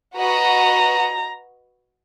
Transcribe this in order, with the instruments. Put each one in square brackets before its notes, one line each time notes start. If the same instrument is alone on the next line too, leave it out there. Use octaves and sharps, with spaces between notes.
[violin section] F#4 B4 D#5 F#5 [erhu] A#5